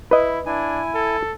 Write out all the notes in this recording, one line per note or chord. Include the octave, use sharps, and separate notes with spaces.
E4 B4 D#5
D4 E4 G#5
A4